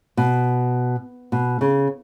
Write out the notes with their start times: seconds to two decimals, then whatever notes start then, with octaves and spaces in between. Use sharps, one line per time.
0.17 B2
1.32 B2
1.61 C#3